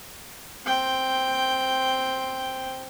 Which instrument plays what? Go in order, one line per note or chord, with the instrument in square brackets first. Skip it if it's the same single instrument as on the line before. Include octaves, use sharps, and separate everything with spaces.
[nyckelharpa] C4 G5